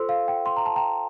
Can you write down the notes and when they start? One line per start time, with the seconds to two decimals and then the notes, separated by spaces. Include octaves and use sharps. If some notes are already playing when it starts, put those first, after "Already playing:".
Already playing: F4 A4 C5 C6 E6
0.09 F5
0.28 G5
0.46 C6
0.56 A#5
0.66 A5
0.76 G5 A#5